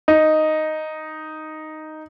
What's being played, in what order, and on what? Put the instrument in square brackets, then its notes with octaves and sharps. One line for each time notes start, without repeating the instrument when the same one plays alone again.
[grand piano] D#4